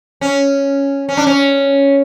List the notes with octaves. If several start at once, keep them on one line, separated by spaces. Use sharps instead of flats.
C#4
C#4
D4
C#4